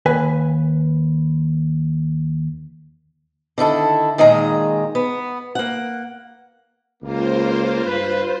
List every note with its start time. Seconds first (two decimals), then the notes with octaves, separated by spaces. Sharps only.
0.06 D#2 B4 G#5
3.58 D3 D#3 E4 A4
4.18 A#2 D#3 G#3 G#4 A#5
4.95 B3
5.55 A#3 F#5
7.03 C#2 A#3 F4 C5
7.85 G2 B4